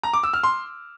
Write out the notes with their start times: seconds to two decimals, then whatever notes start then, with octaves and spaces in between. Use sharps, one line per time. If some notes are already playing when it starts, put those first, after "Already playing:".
0.03 A#5
0.13 D6
0.23 E6
0.33 F6
0.43 C6